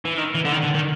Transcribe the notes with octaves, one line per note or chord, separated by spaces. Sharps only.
E3
D#3
E3
D3
D#3
D3
D#3